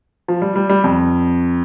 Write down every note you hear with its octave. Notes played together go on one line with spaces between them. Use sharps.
F3
G3
G3
G3
F2